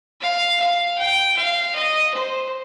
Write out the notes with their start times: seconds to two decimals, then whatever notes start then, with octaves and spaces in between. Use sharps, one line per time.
0.21 F5
0.60 F5
0.98 G5
1.37 F5
1.75 D#5
2.14 C5